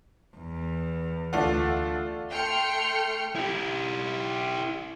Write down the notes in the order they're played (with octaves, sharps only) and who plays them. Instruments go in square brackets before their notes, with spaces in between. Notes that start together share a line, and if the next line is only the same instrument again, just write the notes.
[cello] E2
[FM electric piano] D2 F#5 [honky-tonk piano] A3 D4 F4 [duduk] A4
[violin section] A3 G5 C6 F6 C#7
[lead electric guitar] E4 G4